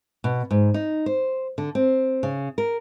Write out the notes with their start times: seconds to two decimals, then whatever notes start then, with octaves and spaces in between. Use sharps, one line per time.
0.24 B2
0.51 G#2
0.74 D#4
1.06 C5
1.58 D3
1.75 C4
2.23 C#3
2.58 A#4